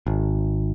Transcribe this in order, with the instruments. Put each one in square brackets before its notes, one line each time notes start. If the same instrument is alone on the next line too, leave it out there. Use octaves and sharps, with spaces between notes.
[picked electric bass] G#1